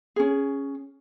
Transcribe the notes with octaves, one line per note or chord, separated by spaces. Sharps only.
C#4 G#4